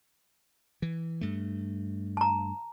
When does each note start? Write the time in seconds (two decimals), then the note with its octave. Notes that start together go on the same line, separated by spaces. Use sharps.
0.82 E3
1.21 G2 A3
2.17 A5 A#5